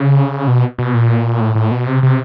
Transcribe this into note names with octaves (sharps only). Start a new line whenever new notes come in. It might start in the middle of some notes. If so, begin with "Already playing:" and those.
Already playing: C#3
B2
B2
A#2
A2
A2
B2
C3
C3